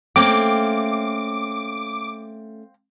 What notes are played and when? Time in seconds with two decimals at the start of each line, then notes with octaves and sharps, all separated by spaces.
0.16 A3 A#3 C4 C#4 G5 D6